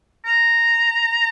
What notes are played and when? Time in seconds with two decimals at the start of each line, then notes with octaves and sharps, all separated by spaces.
0.25 A#5